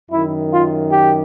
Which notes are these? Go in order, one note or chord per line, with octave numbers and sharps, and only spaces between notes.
F#2 D#3 E4
F4
G4